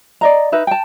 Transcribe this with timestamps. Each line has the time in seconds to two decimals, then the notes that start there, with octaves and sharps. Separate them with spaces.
0.21 D5 D#5 A#5
0.52 D#4 B4 E5
0.67 G5 A5